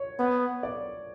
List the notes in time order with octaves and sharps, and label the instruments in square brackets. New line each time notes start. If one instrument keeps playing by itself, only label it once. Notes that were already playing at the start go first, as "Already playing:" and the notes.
Already playing: [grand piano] C#5
[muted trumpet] B3
[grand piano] D5